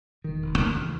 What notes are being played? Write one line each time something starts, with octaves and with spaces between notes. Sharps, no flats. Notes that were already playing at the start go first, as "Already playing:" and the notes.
E1 D#3
E1
D2 D3 E3
C#3